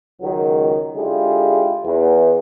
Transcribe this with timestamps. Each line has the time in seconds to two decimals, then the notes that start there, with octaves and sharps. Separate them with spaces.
0.21 C#2 D#3 F#3
0.97 D3 G#3 E4 F4 G4 G#4
1.85 E2